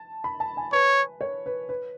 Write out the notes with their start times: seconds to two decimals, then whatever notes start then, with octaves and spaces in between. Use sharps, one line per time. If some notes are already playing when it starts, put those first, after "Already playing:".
Already playing: A5
0.24 B5
0.40 A5
0.57 G#5
0.73 B4 C#5
1.21 C#5
1.46 B4
1.69 B4